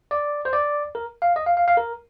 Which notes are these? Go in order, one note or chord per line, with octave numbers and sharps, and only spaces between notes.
D5
C5
D5
A#4
F5
D#5
F5
F5
F5
A#4